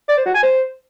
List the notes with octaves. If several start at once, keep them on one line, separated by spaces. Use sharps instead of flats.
D5
C5
F#4
G#5
C5